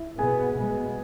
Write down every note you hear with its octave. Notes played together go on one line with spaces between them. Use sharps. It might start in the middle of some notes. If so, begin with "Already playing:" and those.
Already playing: E4 E5
B2 B3 G#4 G#5
B2 G#3 B3